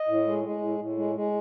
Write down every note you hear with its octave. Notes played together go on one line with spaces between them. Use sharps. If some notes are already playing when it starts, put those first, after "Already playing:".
Already playing: D#5
A2
G#3
G#3
A2
A2
G#3
G#3